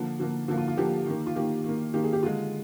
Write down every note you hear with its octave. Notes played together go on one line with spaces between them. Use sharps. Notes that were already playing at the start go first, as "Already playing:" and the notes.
Already playing: D3 F3 A#3
D3 F3 A#3
D3 F3 A#3
F4
F4
D3 F3 A#3 G4
D#3 A#3
F4
D#3 A#3 G4
D#3 A#3
D#3 A#3 G4
G#4
G4
D3 G#3 F4